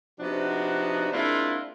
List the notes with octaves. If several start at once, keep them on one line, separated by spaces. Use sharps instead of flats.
C3 F3 B3 D4 D#4 F#4
G#3 A#3 C4 D4 E4 F4